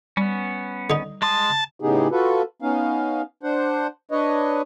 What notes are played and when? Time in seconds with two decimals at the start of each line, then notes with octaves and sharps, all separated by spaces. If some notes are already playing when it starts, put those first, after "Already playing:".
0.17 G3 B3 C#4
0.90 D3 D#4
1.22 G#3 A5 C6 D#6
1.80 A2 C#3 B3 D#4 G4 G#4
2.11 F4 F#4 A4 B4
2.62 B3 C#4 D#4 F5
3.43 D4 C5 F#5
4.11 D4 B4 C#5 D#5